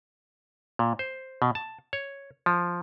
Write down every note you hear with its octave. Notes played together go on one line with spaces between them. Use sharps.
A#2
C5
B2
A5
C#5
F3